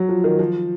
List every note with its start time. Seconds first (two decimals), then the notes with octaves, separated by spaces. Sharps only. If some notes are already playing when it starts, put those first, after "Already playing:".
Already playing: F#3
0.09 F3
0.24 D#3
0.39 F3